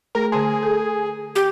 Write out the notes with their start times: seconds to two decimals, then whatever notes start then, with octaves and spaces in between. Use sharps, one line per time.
0.15 A3 G#4 A#4
0.32 D3 G#4 A5 C6
0.63 A4
1.35 G4